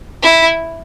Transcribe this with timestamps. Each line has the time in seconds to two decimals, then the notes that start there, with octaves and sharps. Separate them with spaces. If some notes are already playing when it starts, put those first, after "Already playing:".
0.22 E4